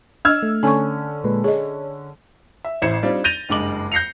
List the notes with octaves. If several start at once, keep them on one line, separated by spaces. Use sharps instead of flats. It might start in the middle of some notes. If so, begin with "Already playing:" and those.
D4 D#5 E6 F6 G#6
A3
D3 C#4 G#5 C#6
A#2 G#3 B4
G#4 C#5 D#5
E5
A1 E4 C5 G#6 C#7 E7
G3 C4 D4 D#4 F4 D5
G6 A6 A#6 D#7 F7 G7
F#1 G2 G#3 D6 F#7
G6 A#6 C7 C#7 F7